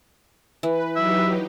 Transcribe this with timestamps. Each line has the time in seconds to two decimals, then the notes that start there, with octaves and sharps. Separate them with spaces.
0.63 E3 B4
0.96 F#3 D#4 G4 E5